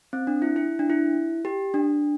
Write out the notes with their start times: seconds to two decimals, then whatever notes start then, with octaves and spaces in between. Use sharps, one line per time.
0.13 C4
0.27 D4
0.42 E4
0.56 E4
0.79 D4
0.90 E4
1.45 G4
1.74 D4